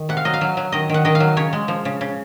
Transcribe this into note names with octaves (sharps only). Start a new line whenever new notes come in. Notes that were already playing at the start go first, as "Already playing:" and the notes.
Already playing: D#3
C3 F#5
F5
F#3 D#5
F5
F#3
F#3
D#3 D#5
D#3 F#5
D#3 D#5
F5
F#3
C#3 C#5
G#3
F3
C#3
C#3